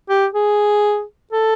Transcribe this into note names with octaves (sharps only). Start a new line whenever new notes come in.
G4
G#4
A4